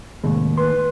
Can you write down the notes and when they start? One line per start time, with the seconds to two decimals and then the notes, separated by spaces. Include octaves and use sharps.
0.24 D#2 A2 C3 G#3
0.57 B4 C6